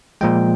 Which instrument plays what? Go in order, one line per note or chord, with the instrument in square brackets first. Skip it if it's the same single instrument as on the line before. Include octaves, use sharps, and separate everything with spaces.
[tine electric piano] A#2 F3 G#3 G5